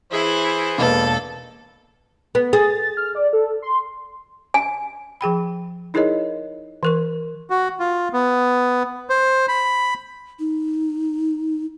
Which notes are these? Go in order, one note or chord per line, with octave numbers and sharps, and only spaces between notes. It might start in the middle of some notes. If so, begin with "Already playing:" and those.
E3 E4 G#4 C5
E1 A#3 A4 B4 D#5 B5
B3
G#4 A6
F6
D5
A4
C6
G#5
F3 G#4 G5 B5
D#4 E4 G#4 A#4 C#5 D#5
E3 A#4 C#6
F#4
F4
B3
C5
B5
D#4